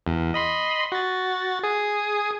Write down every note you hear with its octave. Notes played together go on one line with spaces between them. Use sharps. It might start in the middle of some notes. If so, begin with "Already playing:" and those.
E2
D#5 B5 C6
F#4 A6
G#4 D#6